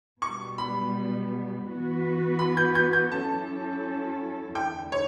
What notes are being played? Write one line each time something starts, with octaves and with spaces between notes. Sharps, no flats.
B2 G3 B3 C#6
B5
E3 B3 F#4 B4
B5
G6
G6
G6
F#3 C#4 E4 A4 A5
E2 D3 A3 E4 G5
C#5